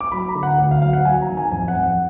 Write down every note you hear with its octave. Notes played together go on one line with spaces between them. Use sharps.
D6
F#3 B5
A#5
D3
F#5
D2
F5
F#3 F5
F#5
F#3 G#5
A#5
D#3
G#5
F2 G#5
F#5
F2
F#5